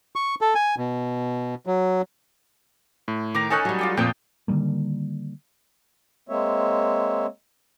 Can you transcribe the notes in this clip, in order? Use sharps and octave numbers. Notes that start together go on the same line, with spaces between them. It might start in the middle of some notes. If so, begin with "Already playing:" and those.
C#6
A4
G#5
B2
F#3
A2
D#3 A#5 D6
C#4 D#4 A4 G#5 C#6 F#6
F#3 G3
F4 D5 G5
F2 A#2 F3 C4 G5 D#6
D3 D#3 G3 A#3
G#3 A#3 C4 C#5 E5